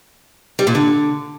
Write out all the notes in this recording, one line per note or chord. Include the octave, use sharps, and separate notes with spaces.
G3
A#2
D3